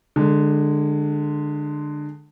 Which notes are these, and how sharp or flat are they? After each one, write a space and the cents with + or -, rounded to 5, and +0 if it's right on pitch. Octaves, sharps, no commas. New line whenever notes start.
D3 +20 G#3 +0